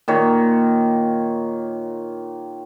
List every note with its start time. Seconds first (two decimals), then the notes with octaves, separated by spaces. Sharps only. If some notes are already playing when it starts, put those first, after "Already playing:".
0.08 A#2 D#3 C#5